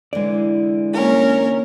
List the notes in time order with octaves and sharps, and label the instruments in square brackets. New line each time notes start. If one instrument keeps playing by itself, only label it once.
[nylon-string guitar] D3 E3 [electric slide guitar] G#3 D5
[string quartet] A#3 C#4 A#4